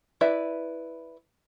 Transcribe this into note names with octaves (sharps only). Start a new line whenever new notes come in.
E4 B4 D5 E5